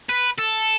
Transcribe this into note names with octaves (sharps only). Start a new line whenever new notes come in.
B4
A4